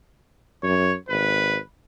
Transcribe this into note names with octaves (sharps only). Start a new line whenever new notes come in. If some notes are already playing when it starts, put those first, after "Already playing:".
F#2 C#5
G#1 B4